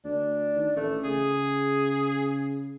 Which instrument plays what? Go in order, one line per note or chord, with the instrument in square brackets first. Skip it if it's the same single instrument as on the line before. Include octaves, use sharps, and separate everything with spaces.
[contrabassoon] D2 [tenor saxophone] D4
[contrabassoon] D#3
[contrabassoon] A1 [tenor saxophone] A3
[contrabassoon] C#3 [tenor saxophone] G#4